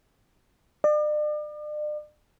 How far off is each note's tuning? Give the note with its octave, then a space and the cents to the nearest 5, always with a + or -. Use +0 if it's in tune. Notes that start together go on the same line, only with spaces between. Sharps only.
D5 +40